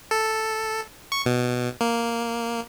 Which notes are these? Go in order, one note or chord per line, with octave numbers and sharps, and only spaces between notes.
A4
C#6
B2
A#3